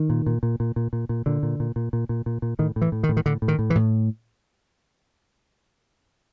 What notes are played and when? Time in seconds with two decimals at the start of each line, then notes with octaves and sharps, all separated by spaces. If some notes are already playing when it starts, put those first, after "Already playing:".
Already playing: D#3
0.10 A#2
0.26 A#2
0.43 A#2
0.60 A#2
0.76 A#2
0.93 A#2
1.09 A#2
1.26 A#2 D3
1.43 A#2
1.60 A#2
1.76 A#2
1.93 A#2
2.09 A#2
2.26 A#2
2.42 A#2
2.59 A2 D#3
2.76 A2
2.82 E3
2.92 A2
3.03 D#3
3.09 A2
3.17 D#3
3.26 A2 D3
3.42 A2
3.48 D#3
3.59 A2
3.70 E3
3.75 A2